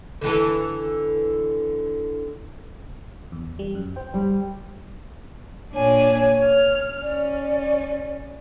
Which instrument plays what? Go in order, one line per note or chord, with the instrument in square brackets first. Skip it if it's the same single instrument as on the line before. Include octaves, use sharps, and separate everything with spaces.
[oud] D3 E3 A4
[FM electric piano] E2
G3
F#2
C5 G5
[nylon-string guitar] G3
[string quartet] A#2 D4 G#5 [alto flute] C#5
[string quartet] F6
[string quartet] C#4 [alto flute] D5